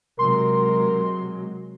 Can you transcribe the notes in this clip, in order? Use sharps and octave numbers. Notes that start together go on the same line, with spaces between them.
C3 F#3 G#3 A#4 C6